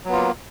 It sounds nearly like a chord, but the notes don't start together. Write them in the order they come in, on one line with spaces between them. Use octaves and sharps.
F#3 B3 F4 A#3